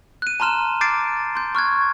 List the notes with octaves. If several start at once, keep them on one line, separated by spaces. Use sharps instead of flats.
F#6 D#7
A5 A#5 C6 F6 E7
D6 G6 A6 C7 D7
C6 G6
C#6 F6 F#6 G#6